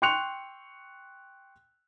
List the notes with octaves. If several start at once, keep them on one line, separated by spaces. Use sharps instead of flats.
G5 C6 C#6 F#6 C#7 F7